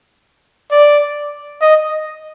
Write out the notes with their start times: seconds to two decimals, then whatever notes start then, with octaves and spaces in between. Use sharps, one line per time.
0.71 D5
1.61 D#5